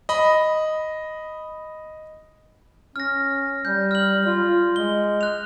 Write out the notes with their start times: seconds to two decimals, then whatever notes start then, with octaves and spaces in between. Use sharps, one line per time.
0.09 D#5 B5
2.96 C#4 F6 A#6
3.65 G3 G6
3.91 F6 F#7
4.26 F4
4.76 G#3 G7
5.21 F#6 F7